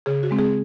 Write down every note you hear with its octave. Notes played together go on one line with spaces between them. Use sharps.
C#3 G#4
F#4
G#3 C4
G#4